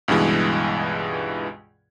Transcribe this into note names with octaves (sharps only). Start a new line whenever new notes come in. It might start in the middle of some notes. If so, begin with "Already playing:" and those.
C#2 G2 B2 E3 G#3